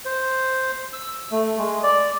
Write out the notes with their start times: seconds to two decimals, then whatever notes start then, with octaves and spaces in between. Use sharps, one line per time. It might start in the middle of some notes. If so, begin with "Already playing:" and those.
0.05 C5
0.93 E6
1.31 A3
1.58 G#3
1.83 D5